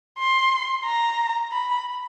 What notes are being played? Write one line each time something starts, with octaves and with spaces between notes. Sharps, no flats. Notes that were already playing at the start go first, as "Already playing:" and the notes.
C6
A#5
B5